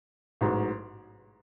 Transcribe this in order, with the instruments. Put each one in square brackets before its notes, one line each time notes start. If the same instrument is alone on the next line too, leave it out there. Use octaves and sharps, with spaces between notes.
[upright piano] A1 G#2 F#3